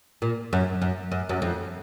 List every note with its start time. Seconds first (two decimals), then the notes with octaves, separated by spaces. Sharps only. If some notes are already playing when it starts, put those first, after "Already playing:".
0.22 A#2
0.53 F#2
0.82 F#2
1.12 F#2
1.29 F#2
1.42 F2